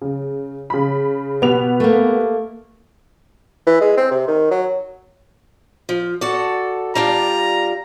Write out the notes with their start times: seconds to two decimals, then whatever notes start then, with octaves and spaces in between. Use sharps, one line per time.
0.01 C#3
0.70 C#3 B5
1.42 B2 B3 G4 F7
1.80 A3 A#3
3.67 E3
3.81 G#3
3.97 C4
4.11 C3
4.28 D#3
4.51 F#3
5.89 F3
6.21 F#4 A4 D5
6.95 G3 D4 F4 A#5